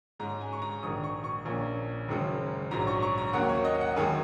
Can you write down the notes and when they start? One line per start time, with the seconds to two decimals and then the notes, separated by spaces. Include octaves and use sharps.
0.19 G#2 G#3 C#4 A#5
0.41 G#5
0.53 C#6
0.62 A#5
0.83 A#1 G#2 D#3 D#6
1.04 C#6
1.24 C#6
1.45 A#1 A#2 A#3 C#4
2.08 F#1 F#2 D#3 G#3 C#4
2.71 A#1 G#2 F#3 A#5
2.87 C#6
3.02 C#6
3.18 A#5
3.33 D#2 D#3 F#3 A#3 C#4 F#5
3.49 C#5
3.65 D#5
3.81 F#5
3.96 F#2 D#3 G#3 G#5